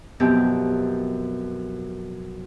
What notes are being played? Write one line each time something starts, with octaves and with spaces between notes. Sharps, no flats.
F#2 B2 F3 C4 G4